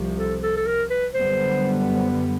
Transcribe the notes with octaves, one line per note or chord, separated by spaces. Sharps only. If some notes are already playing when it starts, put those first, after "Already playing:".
Already playing: C2 C3 F3
A4
A4
A4
A#4
B4
F#2 D3 G3 B3 C5
C5
B4